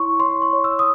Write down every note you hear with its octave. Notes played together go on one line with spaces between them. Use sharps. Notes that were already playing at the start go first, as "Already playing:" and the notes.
Already playing: E4 C#5 C6 C#6
C#5 C6
C#6
C#5
E6
D#6